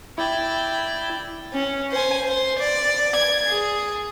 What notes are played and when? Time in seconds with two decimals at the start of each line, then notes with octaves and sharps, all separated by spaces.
0.18 E4 D5 G5
1.53 C#4
1.92 C5 G#5
2.25 C5
2.59 D5
3.17 G#6
3.48 G#4